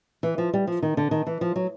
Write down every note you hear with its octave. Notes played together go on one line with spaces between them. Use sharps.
E3
F3
G3
F3
D#3
D3
D#3
E3
F3
F#3